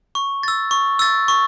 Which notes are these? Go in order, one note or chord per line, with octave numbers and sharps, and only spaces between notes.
C#6
E6 A6
C#6
E6 A6
C#6